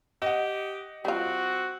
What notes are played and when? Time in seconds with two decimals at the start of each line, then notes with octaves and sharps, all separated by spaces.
0.22 G4 D#5 F#5
1.05 G3 C4 F4 F#4